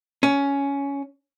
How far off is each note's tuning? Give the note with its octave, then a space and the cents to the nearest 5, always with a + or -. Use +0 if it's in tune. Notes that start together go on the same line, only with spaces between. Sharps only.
C#4 +10